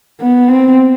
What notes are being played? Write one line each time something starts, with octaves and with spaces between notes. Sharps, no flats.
B3
C4